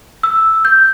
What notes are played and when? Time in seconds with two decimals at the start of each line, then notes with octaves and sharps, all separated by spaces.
0.23 E6
0.65 G6